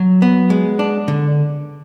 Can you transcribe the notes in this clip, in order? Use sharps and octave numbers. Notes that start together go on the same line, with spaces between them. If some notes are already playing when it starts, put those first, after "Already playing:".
Already playing: F#3
B3
G#3
D4
D3